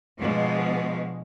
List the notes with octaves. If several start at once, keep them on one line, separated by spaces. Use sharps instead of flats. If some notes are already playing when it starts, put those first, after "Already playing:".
B2 D3 F3 G#3